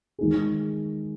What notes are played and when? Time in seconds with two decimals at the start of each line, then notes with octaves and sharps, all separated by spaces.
0.19 D#3 G#3 D#4 G#4